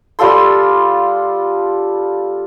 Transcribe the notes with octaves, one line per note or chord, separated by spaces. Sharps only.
G3 F4 A4 C6